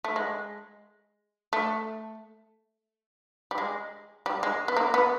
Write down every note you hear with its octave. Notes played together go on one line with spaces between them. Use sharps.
A3
G#3
A3
G3
G#3
G3
G#3
B3
A#3
B3